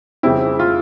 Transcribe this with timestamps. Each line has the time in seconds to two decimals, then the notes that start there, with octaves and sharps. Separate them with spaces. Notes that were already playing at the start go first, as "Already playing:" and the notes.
0.23 F2 C#3 G3 C4 E4
0.59 F4